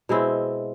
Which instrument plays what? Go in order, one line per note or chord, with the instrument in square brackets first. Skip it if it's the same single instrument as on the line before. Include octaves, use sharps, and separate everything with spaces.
[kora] B2 G#3 C4 E4